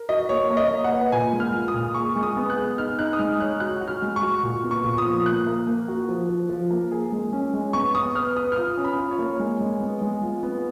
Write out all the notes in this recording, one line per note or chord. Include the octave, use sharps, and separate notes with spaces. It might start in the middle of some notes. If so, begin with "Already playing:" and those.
Already playing: A#4
F#4 D#5
A#3 C#5
A#3
D#5
A#3
F#5
B4
A#2 G#5
G#3
F6
F4
D#6
A#2
G#4 C#6
G#3
D#6
B3
F#6
G#4
D#4 F6
D#4 F#6
D#6
G#3 F6
C#5 F#6
F#4 F#6
F#4
F6
G#3
C#6
F#4
A#2
B3
C#6
A#2
D#6
F3
A#3 F#6
A#3
A#3
F#4
F3
F3
F3
A#3
G#4
G#3
C#4
G#3
B3 C#6
B3 D#6
B4 F6
B4 D#6
F6
F4 D#6
C#4
B5
F4
C#5
A#3
G#3
G#3
B3
G#3
F4
B3